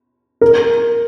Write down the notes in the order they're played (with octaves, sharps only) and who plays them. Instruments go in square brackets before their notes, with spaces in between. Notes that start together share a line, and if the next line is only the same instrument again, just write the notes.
[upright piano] A#4